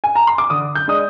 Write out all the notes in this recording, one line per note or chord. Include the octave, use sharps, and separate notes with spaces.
G#5
A#5
C6
D6
D3 D#6
G6
G#3 D4 D#6